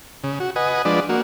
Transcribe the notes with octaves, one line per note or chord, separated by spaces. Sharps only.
C#3
F#4
B4 D#5 F#5 G#5
F3 G#3 D4 B4 D5
A#3 F#4